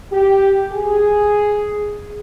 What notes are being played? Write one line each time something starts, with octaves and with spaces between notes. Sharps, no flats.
G4
G#4